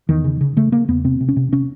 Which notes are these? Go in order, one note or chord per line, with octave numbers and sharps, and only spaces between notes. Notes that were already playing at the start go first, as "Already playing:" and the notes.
E2 D#3
C#3
C#3
C#3 A3
C#3 A#3
E2 B3
C3 C4
C3
C#4
C3
C3 C#4